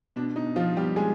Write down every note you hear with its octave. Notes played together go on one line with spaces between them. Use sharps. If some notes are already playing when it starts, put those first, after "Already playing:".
B2 D4
D#4
B2
F3 F4
B2 G3 G4
G#3 G#4